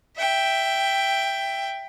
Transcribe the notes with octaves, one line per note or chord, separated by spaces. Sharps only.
E5 G5